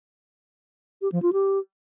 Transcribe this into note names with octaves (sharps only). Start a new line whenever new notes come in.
G4
F3
F4
G4